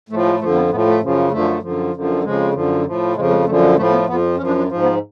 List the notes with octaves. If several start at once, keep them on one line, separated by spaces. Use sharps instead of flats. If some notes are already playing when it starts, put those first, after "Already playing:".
A2 F3 A3
G#3
F2 D3 F3 A3
B3
A2 F3 B3
A3
F#2 C#3 F3
F#2 D3 F3 A3
F#2 D3 F3
F#2 D3 F3
F2 C#3 F3 G#3
F#2 D3 F3
A2 F3
F2 C#3 F3 G#3
G#3
F#2 D3 F3 A3
G#3
A2 F3 A3
B3
F2 F3 B3
F#2 F3 C#4
D4
D4
G#2 F3
B3